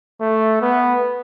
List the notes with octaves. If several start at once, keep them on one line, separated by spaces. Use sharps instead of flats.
A3
B3